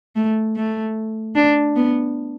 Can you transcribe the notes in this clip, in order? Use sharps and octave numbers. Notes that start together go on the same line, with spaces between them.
A3
A3
D4
B3